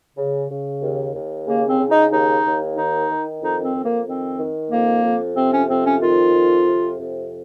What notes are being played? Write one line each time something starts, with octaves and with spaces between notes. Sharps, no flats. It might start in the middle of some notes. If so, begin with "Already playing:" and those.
C#3
C#3
D#2
D#2
C#3 A#3
C4
C#3
D#4
D#2 D#4
D#2
D#3 D#4
D#3
F2 D#4
C4
F2
A#3
D#3 C4
D#3
F2 A#3
F2
C3 C4
C#4
F2 C4
C#4
D#3 F4
F2
C3
F2